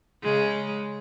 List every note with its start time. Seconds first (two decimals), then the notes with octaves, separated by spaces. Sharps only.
0.22 C#3 G#3